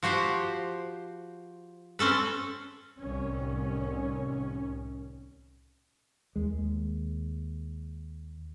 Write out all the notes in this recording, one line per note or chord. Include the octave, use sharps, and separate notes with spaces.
F3 F#4 G4 C5
C4 C#4 A4 B4
C2 A2 D#3 C#4
D#2 G#3